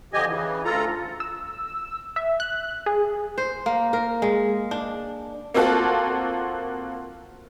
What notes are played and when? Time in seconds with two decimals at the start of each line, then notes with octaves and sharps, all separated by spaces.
0.13 D3 F3 G4 D#5 G#5
0.27 C#3 E3
0.65 D2 F4 A4 A#5
1.20 E6
2.16 E5
2.40 F#6
2.86 G#4
3.38 C5
3.66 A#3
3.93 A#4
4.22 G#3
4.71 D4
5.54 A#3 C4 F4 F#4 A4